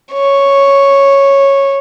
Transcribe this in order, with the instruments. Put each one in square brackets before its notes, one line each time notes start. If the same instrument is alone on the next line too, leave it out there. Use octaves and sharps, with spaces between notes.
[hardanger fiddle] C#5